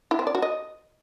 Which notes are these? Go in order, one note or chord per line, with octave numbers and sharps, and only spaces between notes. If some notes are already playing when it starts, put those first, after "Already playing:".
E4
C4
D5
F#4
D#5